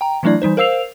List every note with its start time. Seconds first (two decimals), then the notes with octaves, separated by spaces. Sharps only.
0.01 G5 A#5
0.23 E3 F#3 A3 D4 E4 D5
0.42 E3 G3 D#4 C5
0.57 A#4 C5 F5 E6 C7 F7